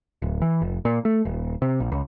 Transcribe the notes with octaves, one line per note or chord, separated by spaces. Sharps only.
D1
E3
F1
A#2
A3
D#1
C3
A#1
C#2